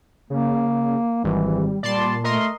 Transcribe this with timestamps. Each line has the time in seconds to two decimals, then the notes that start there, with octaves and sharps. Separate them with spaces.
0.30 C#3 A#3
1.24 G#1 E3 G3
1.83 A#2 G3 D5 A5 C6
2.24 A3 A#4 D#5 C6